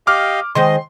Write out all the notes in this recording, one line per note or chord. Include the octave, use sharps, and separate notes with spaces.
G4 D#5 F5 D6 F6
D#3 G#3 C5 D#5 C6